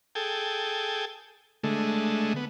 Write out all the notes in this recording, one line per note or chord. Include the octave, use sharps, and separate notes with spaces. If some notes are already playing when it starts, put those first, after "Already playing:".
G#4 A4 G5
D3 G#3 A3
B3